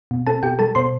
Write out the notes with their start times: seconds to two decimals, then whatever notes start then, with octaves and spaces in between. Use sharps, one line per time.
0.11 B2
0.27 C4 A4 A5
0.43 B2 G4 G5
0.59 G3 A4 A5
0.75 B2 C5 C6